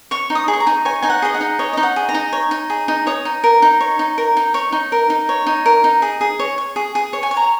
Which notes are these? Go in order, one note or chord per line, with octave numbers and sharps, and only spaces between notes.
C#5 C#6
D#4
D#6
G#4
C#6
A#5
D#4
C#5 G#5
D#4 G#5
F#5
G#4 D#5
F#5
D#4
C#5 D#5
D#4 D#5
F#5
G#4
A#5
D#4
C#5
D#4
G#4
D#4
C#5 D#6
D#4
A#4
D#4
C#5
D#4
A#4
D#4
C#5 C#6
D#4
A#4
D#4
C#5
D#4
A#4
D#4
G#4
G#4
C#5
C#5
G#4
G#4
C#5
G#5
C#5
A#5